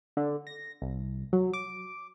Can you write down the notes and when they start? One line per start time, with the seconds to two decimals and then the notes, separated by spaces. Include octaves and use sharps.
0.17 D3
0.47 A#6
0.82 C2
1.33 F#3
1.53 D6